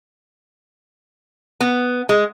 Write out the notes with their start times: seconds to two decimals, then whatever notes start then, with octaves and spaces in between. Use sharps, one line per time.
1.60 B3
2.09 G#3